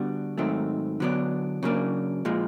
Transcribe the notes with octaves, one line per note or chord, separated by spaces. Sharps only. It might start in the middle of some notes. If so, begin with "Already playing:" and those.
Already playing: D3 G3 B3 D4 F#4
G#2 D#3 F#3 A3 C4
D3 F#3 B3 D4
C#3 F#3 A#3 D4
A#2 F3 G#3